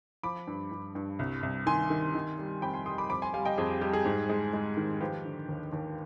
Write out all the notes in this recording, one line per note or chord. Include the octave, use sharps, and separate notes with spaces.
F3 B5 D6
G2
G2
G2
C2
C2
D#3 G#5 C6
D#3
D#3
G3
F2 G5 B5
G#5 C6
G3 C6 D#6
B5 D6
F2 B5 D6
G#5 C6
G3 F5 G#5
D#5 G5
F2 G#4
G4
G3 G4
G#4
G#2
G#3
G#3
D#3
F3 G4 B4
D3
D#2
D#2